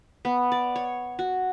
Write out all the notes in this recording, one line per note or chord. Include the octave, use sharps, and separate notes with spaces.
B3
D5
C#5
F#4